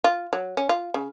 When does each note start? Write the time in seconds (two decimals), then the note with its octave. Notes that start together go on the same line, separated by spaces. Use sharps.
0.04 F4
0.33 F#3
0.57 C#4
0.69 F4
0.94 C#3